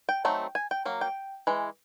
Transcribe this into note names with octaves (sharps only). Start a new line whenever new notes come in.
G5
F#3 A3 C4 D#4
G#5
G5
F#3 A#3
G5
E3 G#3